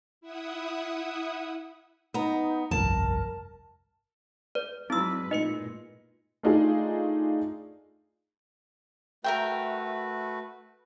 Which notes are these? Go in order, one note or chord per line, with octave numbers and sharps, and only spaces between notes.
E4 E5 F#5 D#6
B3 D#4 A#5
G1 C2 F2 A#4 A5
B4 D5
F#3 G#3 C4 D#4 E4 F#4 B4 E6
A#2 G#3 D#4 B4 D#5 C#7
A3 D4 D#4 F4 G#4
A3 F#4 A#4 B4 E5 G5